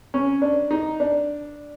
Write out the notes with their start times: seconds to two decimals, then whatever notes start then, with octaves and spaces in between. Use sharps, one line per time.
0.14 C#4
0.42 D4
0.71 D#4
1.00 D4